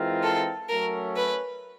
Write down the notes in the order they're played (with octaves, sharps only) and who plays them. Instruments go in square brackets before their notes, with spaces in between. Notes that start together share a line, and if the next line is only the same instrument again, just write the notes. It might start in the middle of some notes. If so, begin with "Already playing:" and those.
Already playing: [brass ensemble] E3 G#3 C4 F4 A#4
[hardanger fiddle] A4
[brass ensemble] F#3 A3 C#4 [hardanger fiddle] A#4
[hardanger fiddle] B4